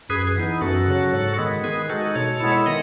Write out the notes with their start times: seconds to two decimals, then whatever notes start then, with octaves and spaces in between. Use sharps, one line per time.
0.09 F#2 G#4 B4
0.27 G#4
0.36 E3 B3 D#4
0.61 F#2 F#4 A4
0.87 C#3 F#3
1.13 G#2
1.38 D#3 G#3 B3
1.64 D#3 G#4 B4
1.89 G#3 D#4 F#4 A4
2.15 B2 A4 C#5
2.40 G#3 B3 E4
2.66 D#3 D#5 F#5